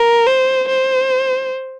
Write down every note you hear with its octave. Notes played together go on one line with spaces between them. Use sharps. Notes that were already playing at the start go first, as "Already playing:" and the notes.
Already playing: A#4
C5
C5